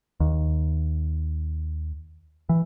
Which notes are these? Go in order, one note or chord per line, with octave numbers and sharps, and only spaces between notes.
D#2
E3